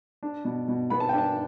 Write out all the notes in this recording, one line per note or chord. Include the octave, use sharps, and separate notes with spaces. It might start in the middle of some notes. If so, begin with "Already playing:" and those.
D4
B2
B2
B3 B5
A5
G5
D4 A5